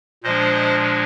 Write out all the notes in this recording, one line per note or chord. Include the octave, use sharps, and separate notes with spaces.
A#2 F3 G#3 D4 C5 D#5